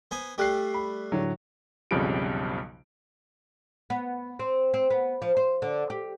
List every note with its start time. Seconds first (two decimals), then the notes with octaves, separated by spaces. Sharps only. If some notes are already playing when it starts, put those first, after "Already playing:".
0.11 B3 C5 G#5
0.38 G3 A3 G5 F#6 C7
0.74 B5
1.12 A2 D3 F#3
1.91 B1 F2 C#3 F3 G3 D7
3.90 B3
4.39 C4
4.74 C4
4.90 B3
5.22 F3
5.37 C5
5.62 D3
5.90 G4